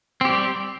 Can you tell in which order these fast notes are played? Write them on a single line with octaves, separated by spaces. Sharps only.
C4 G4 G3